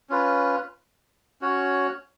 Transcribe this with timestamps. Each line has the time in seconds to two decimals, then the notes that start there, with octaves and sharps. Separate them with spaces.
0.09 C#4 F4 B4
1.41 C#4 F#4 C#5